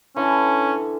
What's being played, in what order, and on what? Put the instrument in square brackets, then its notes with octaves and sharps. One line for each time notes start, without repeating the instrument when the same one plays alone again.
[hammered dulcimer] D3 E3 [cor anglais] C#4